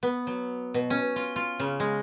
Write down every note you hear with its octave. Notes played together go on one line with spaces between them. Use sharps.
B3
F#3
B2
C#4
F4
F4
C#3
G#3